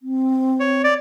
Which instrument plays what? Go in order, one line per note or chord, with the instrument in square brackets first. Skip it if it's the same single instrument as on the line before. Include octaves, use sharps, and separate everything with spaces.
[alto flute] C4
[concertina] C#5
D5